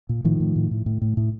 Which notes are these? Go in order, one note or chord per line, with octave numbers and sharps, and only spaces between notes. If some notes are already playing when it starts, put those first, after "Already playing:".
A#2
A2 D#3 F3
A2
A2
A2
A2
A2
A2